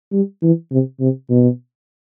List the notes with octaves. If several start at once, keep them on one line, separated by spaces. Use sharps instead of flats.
G3
E3
C3
C3
B2